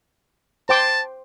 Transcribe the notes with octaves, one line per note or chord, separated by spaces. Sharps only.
C5 G5 A5 D6